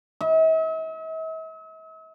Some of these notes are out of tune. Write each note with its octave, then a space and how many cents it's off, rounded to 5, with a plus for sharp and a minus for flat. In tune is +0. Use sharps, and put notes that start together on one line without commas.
E5 -45